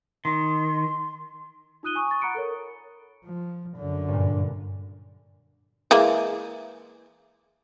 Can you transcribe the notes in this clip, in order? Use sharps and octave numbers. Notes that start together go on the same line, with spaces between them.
D#3 C6
D#4 F4 D#6 F#6 D#7 G7
G#5 C#6 D#6
C#6 A6
F#5 A#5 B5 F#6 C#7 D7
A4 A#4 C#5
F3
F#2 D3
G2 A#2
E3 G#3 A#3